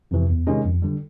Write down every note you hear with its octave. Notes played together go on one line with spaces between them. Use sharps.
F2 C3 E3
E2
C3 D#3 G#3 C#4
F2
D3 G3